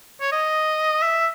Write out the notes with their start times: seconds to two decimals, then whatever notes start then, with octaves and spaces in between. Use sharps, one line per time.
0.21 C#5
0.32 D#5
1.02 E5